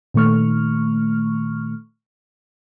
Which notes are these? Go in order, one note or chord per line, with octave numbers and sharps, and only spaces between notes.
A#2 D#3 A3 C#6 F6